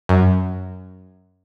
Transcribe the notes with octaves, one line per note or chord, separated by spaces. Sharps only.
F#2